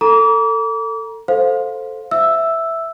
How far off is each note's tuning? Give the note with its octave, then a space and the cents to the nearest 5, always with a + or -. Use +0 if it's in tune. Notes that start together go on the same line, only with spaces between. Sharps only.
A4 +25 A#5 +25 D6 -35
A4 +0 C5 +0 F5 +20
E5 +0 E6 +0